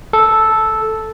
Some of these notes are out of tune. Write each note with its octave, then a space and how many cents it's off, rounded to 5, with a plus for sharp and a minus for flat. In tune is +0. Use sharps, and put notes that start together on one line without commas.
A4 -5